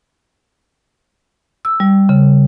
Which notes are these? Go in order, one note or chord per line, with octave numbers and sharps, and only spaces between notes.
E6
G3
C#3